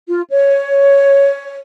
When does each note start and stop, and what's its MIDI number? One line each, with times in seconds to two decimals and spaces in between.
0.08 0.22 65
0.30 1.55 73